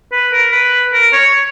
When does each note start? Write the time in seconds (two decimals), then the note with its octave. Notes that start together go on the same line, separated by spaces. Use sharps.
0.12 B4
0.32 A#4
0.52 B4
0.93 A#4
1.13 C#5